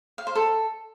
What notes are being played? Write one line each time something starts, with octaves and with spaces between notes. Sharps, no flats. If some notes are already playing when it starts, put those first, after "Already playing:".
F5
C5
A4